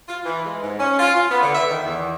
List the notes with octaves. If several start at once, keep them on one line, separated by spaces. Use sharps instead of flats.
F4
E3
G#3
G#2
C#4
F4
F4
B3
D3
E5
D#3
E2